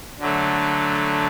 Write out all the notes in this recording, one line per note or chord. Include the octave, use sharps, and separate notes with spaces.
D3 F#3 A3